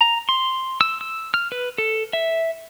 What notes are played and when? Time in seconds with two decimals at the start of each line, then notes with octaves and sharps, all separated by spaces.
0.01 A#5
0.29 C6
0.81 E6
1.01 E6
1.34 F6
1.52 B4
1.78 A4
2.13 E5